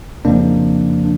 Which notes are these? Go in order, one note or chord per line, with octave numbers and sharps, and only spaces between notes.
F2 C#3 F3 A#3 D4